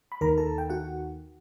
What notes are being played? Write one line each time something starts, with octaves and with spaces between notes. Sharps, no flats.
B5
D#2 D#3 A#4 A#5
A4 A5
G5
F#4 F#5